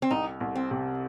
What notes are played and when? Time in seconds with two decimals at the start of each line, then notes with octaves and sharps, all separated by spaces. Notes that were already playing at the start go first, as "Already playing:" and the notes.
0.02 C4
0.11 C2 D#4
0.41 C2
0.55 C4
0.71 C3